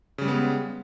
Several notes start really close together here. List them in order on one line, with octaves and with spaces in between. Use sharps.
C#3 G3 G#3 B3